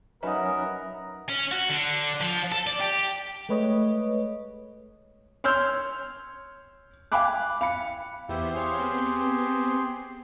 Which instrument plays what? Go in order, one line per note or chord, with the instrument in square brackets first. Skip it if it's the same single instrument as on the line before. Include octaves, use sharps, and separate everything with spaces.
[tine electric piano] F#3 C#4 D#4 [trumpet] A#4 [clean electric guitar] B4 F#5 [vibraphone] E5 D#6
[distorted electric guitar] C#4
F#4
D3
F3
A4
D5
G4
[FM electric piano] G#3 A3 B4 C#5 D#5
[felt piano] C#5 C6 E6 F6 G6
F5 G5 G#5 B5 D6 F#6
F5 B5 C#7
[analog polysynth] E2 B3 C5 [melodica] E4 G4
[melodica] G4 G#4 C6 [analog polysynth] C5 C#5 F5
[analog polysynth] B3 C4